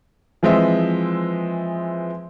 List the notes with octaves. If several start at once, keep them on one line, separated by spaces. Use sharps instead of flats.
E3 F3 G#3 C4 D#5 E5